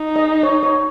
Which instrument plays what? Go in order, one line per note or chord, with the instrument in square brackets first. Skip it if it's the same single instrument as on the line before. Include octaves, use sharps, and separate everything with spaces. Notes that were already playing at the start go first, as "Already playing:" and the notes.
Already playing: [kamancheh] D#4
[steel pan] D#5
C#5
C#5